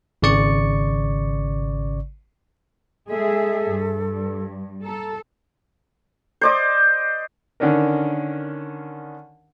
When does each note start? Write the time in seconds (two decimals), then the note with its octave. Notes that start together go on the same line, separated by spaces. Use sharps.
0.22 G#1 C#3 D5 C#6 C#7
3.09 G#3 G#4 A4 E5
3.69 G2
4.85 A4 A#5
6.41 C5 D5 D#5
7.60 D3 D#3 C#4 D4 A#4